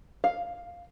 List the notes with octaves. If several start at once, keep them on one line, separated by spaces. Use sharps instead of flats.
F5